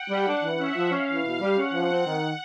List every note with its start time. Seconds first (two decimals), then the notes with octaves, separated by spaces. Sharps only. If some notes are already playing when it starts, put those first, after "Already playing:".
Already playing: F#5 G5
0.10 G3
0.26 D4 F#5
0.42 E3
0.59 C#4 E5
0.75 F3
0.91 C#4 F5
1.08 E3
1.24 B2
1.41 G3
1.57 C#4 F#5
1.73 F3
1.89 C4
2.06 D#3